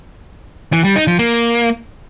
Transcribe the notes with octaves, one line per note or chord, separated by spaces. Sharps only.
E3
G3
D#4
F3
A#3